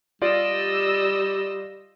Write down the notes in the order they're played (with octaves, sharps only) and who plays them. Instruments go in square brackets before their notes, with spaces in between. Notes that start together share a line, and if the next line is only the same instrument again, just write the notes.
[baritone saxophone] G3 [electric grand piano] F4 G4 D5 [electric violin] D#5 E6